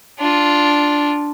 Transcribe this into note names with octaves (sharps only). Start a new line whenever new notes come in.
D4 F4